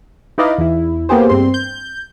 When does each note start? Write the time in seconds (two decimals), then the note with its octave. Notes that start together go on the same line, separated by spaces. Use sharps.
0.38 D#4 E4 B4 D5 D#5 F5
0.58 E2 E4
1.09 A#3 B3 G4 G#4 C5
1.29 G2 C4 C6
1.54 G6